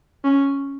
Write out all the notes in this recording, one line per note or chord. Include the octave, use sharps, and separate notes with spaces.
C#4